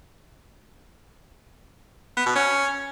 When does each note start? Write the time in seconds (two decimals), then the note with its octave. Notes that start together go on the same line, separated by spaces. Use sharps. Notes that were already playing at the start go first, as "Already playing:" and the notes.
2.17 B3
2.26 B2
2.35 C#4